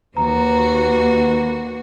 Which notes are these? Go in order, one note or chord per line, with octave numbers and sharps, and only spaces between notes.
D#2 A#3 F#4 B4 A#5